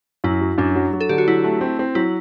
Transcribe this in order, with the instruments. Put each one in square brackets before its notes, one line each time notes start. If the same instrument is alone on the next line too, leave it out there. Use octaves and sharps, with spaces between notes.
[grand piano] F#2 [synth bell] E4
[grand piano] F#3
[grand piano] F#2 [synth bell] D4
[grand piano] F#3
F#3
[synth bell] A4
[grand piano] D3 [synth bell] G4
[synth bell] F#4
[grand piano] F#3 [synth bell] E4
[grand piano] A3
C4
C4
[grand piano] F#3 [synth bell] E4